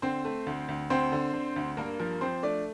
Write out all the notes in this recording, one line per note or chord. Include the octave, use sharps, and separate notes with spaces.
D3 C4 C5
A3
D2
D2
D2 C4 C5
D3
D3
D2
G2 A#3 A#4
F3 A#3 A#4
F3 C4 C5
A3 D4 D5